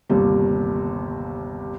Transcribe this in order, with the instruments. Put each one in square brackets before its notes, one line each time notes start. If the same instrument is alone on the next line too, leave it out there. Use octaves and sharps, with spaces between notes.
[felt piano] G1 D#2 C3 G3